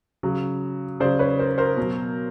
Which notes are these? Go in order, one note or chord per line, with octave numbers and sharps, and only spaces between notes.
C#3 F#3
C#3 F#3 C5 D5
B4 C#5
A#4 C5
A#4 C5
B2 F#3